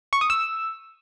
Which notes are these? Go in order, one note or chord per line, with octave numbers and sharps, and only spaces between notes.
C#6
D#6
E6